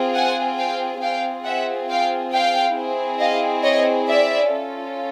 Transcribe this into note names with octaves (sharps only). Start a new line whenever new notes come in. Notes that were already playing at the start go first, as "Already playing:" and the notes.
Already playing: C4 F4 G#4
F#5 G#5
F5 G5
C4 F4 G#4 F5 G5
E5 F#5
F5 G5
F5 G5
C4 E4 G#4
D#5 F5
C#5 D#5
D5 E5
C#4 F4 A4